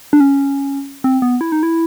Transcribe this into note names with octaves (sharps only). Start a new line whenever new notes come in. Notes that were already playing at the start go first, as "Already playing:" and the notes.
D4
C#4
C4
B3
E4
D#4
E4